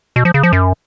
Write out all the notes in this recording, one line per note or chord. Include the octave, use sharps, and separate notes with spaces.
B2
F3
C#3
F3
F#2